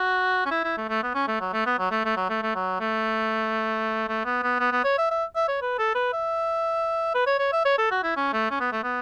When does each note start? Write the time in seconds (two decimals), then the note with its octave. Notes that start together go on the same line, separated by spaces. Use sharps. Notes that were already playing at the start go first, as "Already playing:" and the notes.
Already playing: F#4
0.46 C#4
0.51 E4
0.64 E4
0.77 A3
0.89 A3
1.03 B3
1.14 C#4
1.28 A3
1.41 F#3
1.53 A3
1.66 B3
1.79 F#3
1.91 A3
2.05 A3
2.16 F#3
2.29 A3
2.42 A3
2.55 F#3
2.80 A3
4.08 A3
4.25 B3
4.43 B3
4.60 B3
4.72 B3
4.84 C#5
4.98 E5
5.11 E5
5.36 E5
5.48 C#5
5.61 B4
5.79 A4
5.95 B4
6.13 E5
7.14 B4
7.26 C#5
7.39 C#5
7.52 E5
7.65 C#5
7.78 A4
7.91 F#4
8.03 E4
8.16 C#4
8.33 A3
8.51 C#4
8.60 B3
8.72 A3
8.83 B3